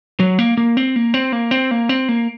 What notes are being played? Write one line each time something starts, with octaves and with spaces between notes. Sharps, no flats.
F#3
A#3
A#3
C4
A#3
C4
A#3
C4
A#3
C4
A#3